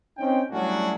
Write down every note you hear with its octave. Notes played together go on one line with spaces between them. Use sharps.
C4 C#4 D#4 G5
A2 F#3 G3 C#4 D4 F#4